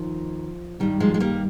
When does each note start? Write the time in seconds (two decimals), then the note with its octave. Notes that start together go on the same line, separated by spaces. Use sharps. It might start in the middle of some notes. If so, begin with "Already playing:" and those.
Already playing: D#2 D#3 F3
0.80 G2 D#3 G3
1.00 F3 G#3
1.14 G#3
1.20 G3 A#3